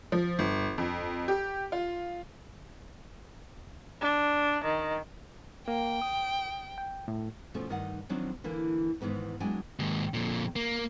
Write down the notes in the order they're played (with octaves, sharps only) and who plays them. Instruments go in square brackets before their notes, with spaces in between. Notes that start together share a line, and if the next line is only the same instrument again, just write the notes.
[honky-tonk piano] F3
G1
F2
G4
F4
[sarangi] D4
D#3
[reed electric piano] A#3 [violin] G5
[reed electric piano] D#6
G5
A2
[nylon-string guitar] B2 F3 A3 C#4
G2 D#3 D#4 D#5 F#5
D#3 F3 F#3 C4 D4 D#4
D3 E3 A#3
G#2 D#3 E3 B3 D#4
F#3 G#3 D4 E4 G5 G#5
[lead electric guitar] D#2 G#2
F2 A#2
A#3